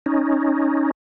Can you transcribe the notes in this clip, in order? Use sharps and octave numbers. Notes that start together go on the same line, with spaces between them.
C#4 D#4